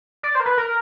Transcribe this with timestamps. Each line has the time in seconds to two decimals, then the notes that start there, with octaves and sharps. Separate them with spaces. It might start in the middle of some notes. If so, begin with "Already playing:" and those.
0.23 D5
0.35 C5
0.40 A#4
0.46 B4
0.58 A#4